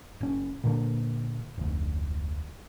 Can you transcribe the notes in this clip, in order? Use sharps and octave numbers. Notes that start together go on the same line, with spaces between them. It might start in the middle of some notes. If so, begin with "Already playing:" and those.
F#1 C#4
A#2 D3 A#3
F1 D2